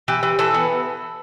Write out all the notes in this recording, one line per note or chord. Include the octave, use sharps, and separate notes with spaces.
E3 G4
E3
E3 A4
B3